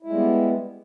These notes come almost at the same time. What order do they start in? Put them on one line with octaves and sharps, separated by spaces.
E4 G#3 G3 B3